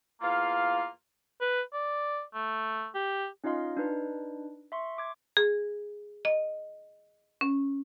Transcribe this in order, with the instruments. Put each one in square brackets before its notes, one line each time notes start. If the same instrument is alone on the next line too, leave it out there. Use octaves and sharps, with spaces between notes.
[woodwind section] E2 A#3 F4 F5
[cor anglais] B4
D5
A3
G4
[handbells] C#4 D#4 F4 D#5 F5 C6
D4 D#4 B4
E5 C6 C#6
C6 D6 G#6
[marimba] G#4
D#5
C#4